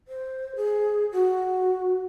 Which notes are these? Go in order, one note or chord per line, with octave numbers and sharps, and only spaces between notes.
C5
G#4
F#4